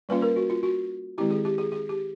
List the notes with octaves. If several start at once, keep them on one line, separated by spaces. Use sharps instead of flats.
G3 A#3 C#4 F4 B4
A#4
F#4
F4
F#4
D#3 G#3 C4 E4 G4
G#4
G4
G#4
G#4
G4